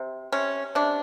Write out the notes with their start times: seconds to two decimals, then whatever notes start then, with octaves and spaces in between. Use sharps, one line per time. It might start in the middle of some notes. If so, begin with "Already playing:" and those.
Already playing: C3
0.32 C3 C#4
0.75 C3 D4